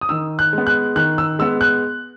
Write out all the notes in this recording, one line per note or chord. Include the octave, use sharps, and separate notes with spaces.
D#6
D#3 E6
F#6
G#3 B3
F#6
D#3 F#6
E6
G#3 B3 E6
F#6